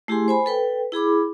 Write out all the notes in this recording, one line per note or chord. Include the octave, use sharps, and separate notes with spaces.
A3 E4 G4 G#4 G#5 C6
C5 G#5 B5
A4 B4 G5
E4 G#4 B5 D6